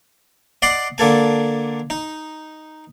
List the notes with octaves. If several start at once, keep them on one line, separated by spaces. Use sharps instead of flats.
D5 D#5 F#5 C6
D3 A#3 A4 G#5
D#4